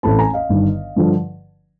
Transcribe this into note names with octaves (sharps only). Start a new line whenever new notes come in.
A1 A2 E3 A3 C4 A5 B5
G#5 A#5
D#5 F5
G1 G2 D#3
G2 D3 F3